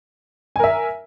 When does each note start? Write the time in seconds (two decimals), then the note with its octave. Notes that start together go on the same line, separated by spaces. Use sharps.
0.56 G#5
0.60 A#4
0.64 E5